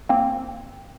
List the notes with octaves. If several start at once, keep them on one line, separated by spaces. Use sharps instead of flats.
A#3 C4